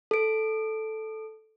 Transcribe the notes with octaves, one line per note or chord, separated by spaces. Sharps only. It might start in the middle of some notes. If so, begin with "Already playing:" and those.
A4 D7